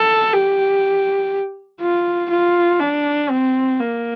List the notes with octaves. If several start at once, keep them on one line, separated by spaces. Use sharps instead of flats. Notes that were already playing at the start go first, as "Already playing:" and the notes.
Already playing: A4
G4
F4
F4
D4
C4
A#3